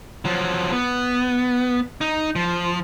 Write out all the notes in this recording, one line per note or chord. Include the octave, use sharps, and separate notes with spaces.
F3 F#3
B3
D#4
F3